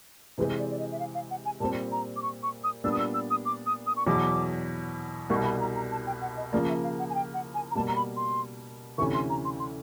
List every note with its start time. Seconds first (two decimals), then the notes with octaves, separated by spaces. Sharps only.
0.38 C3 E3 G#3 C4 B4
0.59 D5
0.70 D5
0.79 D#5
0.91 E5
0.99 F5
1.14 F5
1.31 F#5
1.45 G#5
1.60 A#2 G3 C4 A5
1.92 A#5
2.16 D6
2.22 C#6
2.43 C#6
2.64 D#6
2.84 A#2 G3 B3 D4 E6
2.92 D#6
2.98 E6
3.14 E6
3.30 D#6
3.45 D6
3.66 D#6
3.86 D#6
3.96 C#6
4.06 E2 B2 F#3 D6
5.30 C2 B2 G3 C#6
5.44 B5
5.60 A#5
5.75 A#5
5.91 A5
6.06 G5
6.21 F#5
6.37 D#5
6.52 C#3 F3 A#3 D5
6.68 E5
6.83 F5
6.99 F#5
7.10 G#5
7.14 G5
7.34 F#5
7.54 G#5
7.71 A#5
7.75 B2 G3 A#3 A5
7.88 A#5
7.95 B5
8.16 C6
8.98 D2 C3 E3 A3 C#4 C#6
9.14 C6
9.30 A#5
9.45 C6
9.60 C6